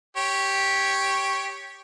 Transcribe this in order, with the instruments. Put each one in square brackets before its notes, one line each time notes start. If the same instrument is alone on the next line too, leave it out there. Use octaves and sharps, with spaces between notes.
[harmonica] G4 C#5